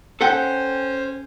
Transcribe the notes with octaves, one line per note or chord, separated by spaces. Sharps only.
C#4 A4 C5 F#5 G5